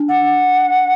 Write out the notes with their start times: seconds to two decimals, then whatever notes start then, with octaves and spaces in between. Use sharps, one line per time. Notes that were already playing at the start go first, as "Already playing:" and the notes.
Already playing: D4
0.09 F#5